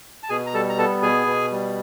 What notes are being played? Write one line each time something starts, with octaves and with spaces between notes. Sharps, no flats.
A5
B2 G#4 G#5
A#5
G3 A4 A5
A#5
B3 A4 A5
B2 G#4 G#5
B2
G3